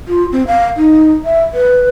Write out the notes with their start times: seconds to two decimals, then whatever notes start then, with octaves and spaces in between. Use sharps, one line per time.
0.08 F4
0.32 C4
0.47 F5
0.77 D#4
1.25 E5
1.54 B4